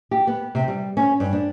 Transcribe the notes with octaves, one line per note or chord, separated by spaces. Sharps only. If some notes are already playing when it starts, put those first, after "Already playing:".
G4
B3
C3
G3
C#4
G2
D4